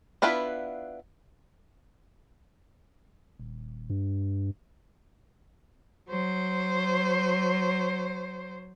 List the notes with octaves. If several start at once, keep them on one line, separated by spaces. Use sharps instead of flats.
B3 D4 E4 F4 B4
D#1
G2
F#3 C5